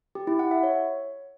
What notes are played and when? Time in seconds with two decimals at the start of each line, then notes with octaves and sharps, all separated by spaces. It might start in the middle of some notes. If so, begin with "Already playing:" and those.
0.15 G4
0.27 E4
0.39 F#5
0.51 E5
0.63 C#5